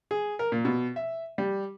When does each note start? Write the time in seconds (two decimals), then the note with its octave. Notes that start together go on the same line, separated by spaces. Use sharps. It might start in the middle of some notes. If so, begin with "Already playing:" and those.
0.11 G#4
0.39 A#4
0.52 A#2
0.65 B2
0.96 E5
1.38 G3